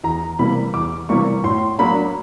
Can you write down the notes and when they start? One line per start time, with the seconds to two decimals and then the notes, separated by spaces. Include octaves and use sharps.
0.04 E2 A#5
0.39 C3 E3 G3 A#3 B5
0.74 E2 D6
1.09 C3 E3 G3 A#3 C#6
1.44 A2 C6
1.79 F#3 A#3 D4 B5